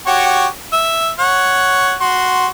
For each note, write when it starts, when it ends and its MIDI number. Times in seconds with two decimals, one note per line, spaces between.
0.07 0.46 66
0.07 0.46 67
0.07 0.46 73
0.73 1.09 76
1.19 1.94 73
1.19 1.94 78
2.01 2.47 66
2.01 2.47 84